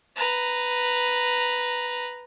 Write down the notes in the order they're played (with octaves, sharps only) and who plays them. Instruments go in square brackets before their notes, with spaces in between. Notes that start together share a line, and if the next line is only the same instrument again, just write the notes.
[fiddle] B4 A#5